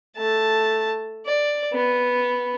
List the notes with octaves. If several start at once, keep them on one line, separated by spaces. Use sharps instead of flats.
A3 A5
D5
B3